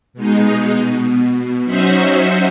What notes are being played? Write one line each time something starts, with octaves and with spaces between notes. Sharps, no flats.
B2 G#3 D#4
B2
F#3 C#4 D#4 F#4 C5 E5